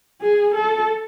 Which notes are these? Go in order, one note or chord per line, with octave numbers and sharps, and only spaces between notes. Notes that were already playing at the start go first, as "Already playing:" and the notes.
G#4
A4